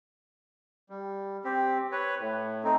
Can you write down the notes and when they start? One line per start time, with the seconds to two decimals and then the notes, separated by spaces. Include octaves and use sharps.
0.89 G3
1.44 C4 G4
1.92 B4 C#5
2.19 A2
2.64 A3 C4 D#4